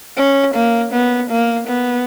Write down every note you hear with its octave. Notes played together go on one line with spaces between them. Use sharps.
C#4
A#3
B3
A#3
B3